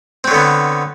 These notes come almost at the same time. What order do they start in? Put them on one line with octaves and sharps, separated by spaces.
C4 F#3 D3 B3